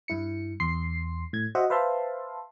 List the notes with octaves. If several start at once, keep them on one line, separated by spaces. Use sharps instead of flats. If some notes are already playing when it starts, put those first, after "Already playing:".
G2 E4 C#7
E2 C6 C7
A2 G#6
F#4 C5 D#5 E5 F#5
B4 C5 E5 F5 A5 C6